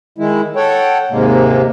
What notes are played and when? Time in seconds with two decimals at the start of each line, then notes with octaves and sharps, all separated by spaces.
0.18 D#3 G#3 E4
0.56 A4 C#5 F#5 G5
1.11 D#2 G#2 C3 G#3 A#3